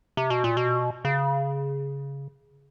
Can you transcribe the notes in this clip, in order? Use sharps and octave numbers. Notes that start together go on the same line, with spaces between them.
C3
B2
A#2
B2
C#3